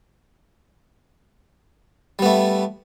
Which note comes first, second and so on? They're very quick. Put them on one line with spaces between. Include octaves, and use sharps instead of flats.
G3 B3 A3